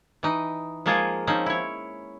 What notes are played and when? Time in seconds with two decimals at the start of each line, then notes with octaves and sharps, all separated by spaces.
0.23 E3 D#4
0.86 F3 G#3 A#3 F4 G#4 A#4
1.27 F3 C4 C#4 D#4
1.46 E4 C#5